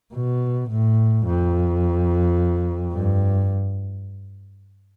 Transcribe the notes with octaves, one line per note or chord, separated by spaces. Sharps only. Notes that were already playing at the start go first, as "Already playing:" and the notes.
B2
A2
F2
G2